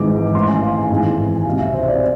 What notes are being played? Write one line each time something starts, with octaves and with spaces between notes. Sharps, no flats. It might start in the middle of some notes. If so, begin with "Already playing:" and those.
Already playing: G#1 G#2 E3 D6
A1 A2 E3 C6
G#5
F5
G#5
G#1 G#2 E3 G#5
G#5
C2 B2 F5
F5
E5
C5
E5
D5